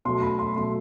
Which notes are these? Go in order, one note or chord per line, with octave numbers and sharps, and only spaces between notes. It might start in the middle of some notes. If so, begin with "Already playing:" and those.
B2 F#3 A3 C6
B5
C6
B2 F#3 A3 C6